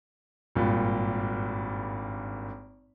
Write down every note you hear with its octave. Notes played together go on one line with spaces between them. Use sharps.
G#1 G2 A#2